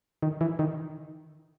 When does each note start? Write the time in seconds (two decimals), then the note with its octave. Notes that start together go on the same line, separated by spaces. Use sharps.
0.23 D#3
0.41 E3
0.59 D#3